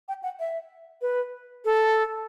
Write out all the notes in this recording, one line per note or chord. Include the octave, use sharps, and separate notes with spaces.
G5
F#5
E5
B4
A4